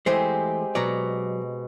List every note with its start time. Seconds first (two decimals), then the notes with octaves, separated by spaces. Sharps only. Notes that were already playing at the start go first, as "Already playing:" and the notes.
0.06 E3 G#3 A3 C4 G4 C5
0.75 B2 F#3 D5 A#5